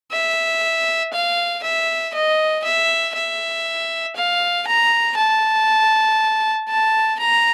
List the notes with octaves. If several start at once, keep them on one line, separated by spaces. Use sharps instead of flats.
E5
F5
E5
D#5
E5
E5
F5
A#5
A5
A5
A#5